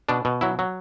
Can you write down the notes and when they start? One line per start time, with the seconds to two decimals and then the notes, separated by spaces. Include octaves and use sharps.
0.09 B2 D4
0.25 B2
0.41 F#3 E4
0.59 F#3